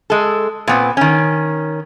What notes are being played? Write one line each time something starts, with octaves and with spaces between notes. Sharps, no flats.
G#3 A4
A#2 B3 C4
D#3 C#4